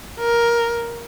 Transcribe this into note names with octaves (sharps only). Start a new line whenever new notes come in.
A#4